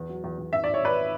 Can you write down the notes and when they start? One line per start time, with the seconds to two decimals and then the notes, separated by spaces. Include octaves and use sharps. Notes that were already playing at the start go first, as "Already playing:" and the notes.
Already playing: E2
0.09 F#3
0.24 E2
0.39 E2
0.52 G#1 E5
0.64 G#1 D5
0.74 C#5
0.83 G#1 B4 D5